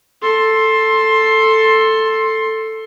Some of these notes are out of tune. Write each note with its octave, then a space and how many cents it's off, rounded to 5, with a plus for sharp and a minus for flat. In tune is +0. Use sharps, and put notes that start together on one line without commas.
A4 +5 C6 +15